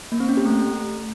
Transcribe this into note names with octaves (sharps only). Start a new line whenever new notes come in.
A#3
C4
C#4
G4
A3